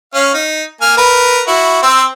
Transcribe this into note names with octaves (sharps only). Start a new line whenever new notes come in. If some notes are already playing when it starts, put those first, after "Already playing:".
C#4 F5
D#4
A#3 G#5 F6
A#4 B4
E4 F#4
C4 C6 E6